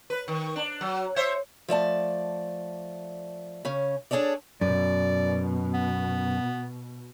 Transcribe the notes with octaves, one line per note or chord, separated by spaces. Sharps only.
B4
D#3
D4
F#3
C5 C#5 E5
F3 A3 D5 A5
C#3 C#4
D4 G#4 A4 C#5 D5
F#2 B2 D5
B3